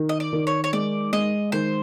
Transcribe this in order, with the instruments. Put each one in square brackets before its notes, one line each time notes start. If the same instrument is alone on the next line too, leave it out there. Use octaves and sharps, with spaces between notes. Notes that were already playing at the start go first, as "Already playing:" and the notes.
Already playing: [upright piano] D#3
[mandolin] D#5
D5
[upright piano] D#3
[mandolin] C#5
C#5
[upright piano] G#3 [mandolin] D5
[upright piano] G#3 [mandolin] D#5
[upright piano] D#3 [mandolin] C5